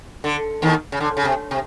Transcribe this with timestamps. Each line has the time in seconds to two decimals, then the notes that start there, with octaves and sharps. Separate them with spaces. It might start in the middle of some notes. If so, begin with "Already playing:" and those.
0.24 D3
0.62 D#2 D#3
0.92 C#3
1.00 D3
1.17 C#3
1.25 C3
1.51 C3